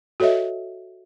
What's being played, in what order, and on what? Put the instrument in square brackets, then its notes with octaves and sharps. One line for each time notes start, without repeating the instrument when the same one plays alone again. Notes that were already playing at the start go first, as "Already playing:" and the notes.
[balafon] F#4 A4 C#5 D#5 E5